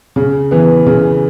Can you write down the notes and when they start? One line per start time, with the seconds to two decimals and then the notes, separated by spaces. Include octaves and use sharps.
0.16 C#3
0.51 E3 B3
0.86 C#3